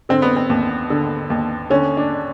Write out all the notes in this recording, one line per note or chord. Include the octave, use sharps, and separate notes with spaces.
D3 C4
B3
C4
D#2
D3
D#2
D3 C#4
D4